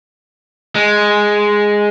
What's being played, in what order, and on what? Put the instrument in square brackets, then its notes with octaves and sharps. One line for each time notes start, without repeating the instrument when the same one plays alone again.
[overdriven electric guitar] G#3